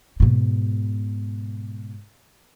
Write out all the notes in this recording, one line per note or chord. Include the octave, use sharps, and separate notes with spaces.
G#2 B2